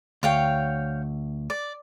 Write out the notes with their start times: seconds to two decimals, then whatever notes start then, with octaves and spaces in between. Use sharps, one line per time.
0.23 D2 C#5 F5 G5
1.50 D5